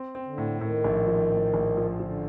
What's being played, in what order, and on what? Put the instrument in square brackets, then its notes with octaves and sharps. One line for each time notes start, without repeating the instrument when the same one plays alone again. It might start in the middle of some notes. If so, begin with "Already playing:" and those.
Already playing: [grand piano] C4
C4
[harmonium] D3
[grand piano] A2
[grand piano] A2 [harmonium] D#3
[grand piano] A#1
F3
A2
A#1
F3
[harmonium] D3 [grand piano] F3